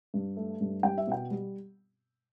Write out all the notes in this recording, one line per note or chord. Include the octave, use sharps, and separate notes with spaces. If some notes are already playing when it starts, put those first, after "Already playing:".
G2
A3
G2
G3 G5
E5
B2 G5
G3